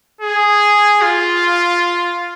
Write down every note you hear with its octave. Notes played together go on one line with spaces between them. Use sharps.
G#4
F4